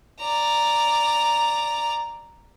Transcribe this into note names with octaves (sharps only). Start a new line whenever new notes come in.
D5 A#5